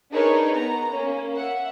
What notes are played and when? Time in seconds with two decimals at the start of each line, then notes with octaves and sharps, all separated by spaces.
0.11 D4 D#4 G#4 A#4 B4 C#5
0.54 B3 A#5
0.91 A#3 C#4
1.36 E5 F#5